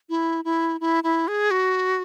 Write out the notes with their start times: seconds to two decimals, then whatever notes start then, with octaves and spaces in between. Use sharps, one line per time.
0.09 E4
0.44 E4
0.80 E4
1.03 E4
1.28 G#4
1.51 F#4